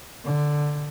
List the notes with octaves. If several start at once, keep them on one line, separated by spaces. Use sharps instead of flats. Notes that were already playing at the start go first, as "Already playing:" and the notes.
D3